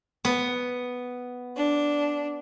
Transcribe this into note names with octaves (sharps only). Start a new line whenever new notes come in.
B3
D4